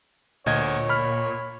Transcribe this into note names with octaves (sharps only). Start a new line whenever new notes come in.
D2 A#2 C#5 D#5 G#6
B5 F6